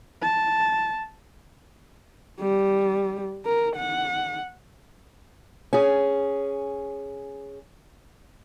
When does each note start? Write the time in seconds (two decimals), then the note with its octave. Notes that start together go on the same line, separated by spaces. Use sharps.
0.22 A5
2.40 G3
3.45 A#4
3.76 F#5
5.73 C#4 G#4